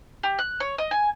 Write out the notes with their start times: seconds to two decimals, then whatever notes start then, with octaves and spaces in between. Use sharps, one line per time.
0.23 G4
0.39 F#6
0.60 C#5
0.78 D#5
0.91 G#5